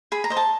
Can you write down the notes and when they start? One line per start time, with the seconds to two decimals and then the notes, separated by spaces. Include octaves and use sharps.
0.12 G#4 B5
0.24 A#5
0.30 C5 D#5
0.37 A5